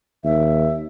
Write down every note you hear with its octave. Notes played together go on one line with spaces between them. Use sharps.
D#2 E5